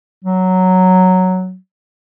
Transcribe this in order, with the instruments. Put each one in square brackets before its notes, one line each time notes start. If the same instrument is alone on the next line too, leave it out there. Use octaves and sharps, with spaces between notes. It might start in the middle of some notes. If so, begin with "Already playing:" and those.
[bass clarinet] F#3